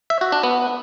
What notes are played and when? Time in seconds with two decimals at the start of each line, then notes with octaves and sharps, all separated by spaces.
0.10 E5
0.21 F#4
0.32 D4
0.43 B3